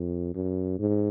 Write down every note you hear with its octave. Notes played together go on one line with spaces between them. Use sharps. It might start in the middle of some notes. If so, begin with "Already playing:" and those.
Already playing: F2
F#2
G#2